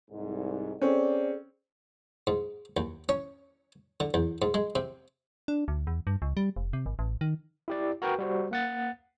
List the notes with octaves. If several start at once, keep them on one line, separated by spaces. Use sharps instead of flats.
C2 G#2
C4 C#4 G#4 A4 D5
G#2
D#2
C#4
D3
E2
G#2
G#3
C3
D4
D2
E2
G2
C#2
G3
F1
C3
G#1
A1
D#3
E4 G4 D5
F#4 A#4 B4 G5
G3 F#4 C5
A#3 F#5 A6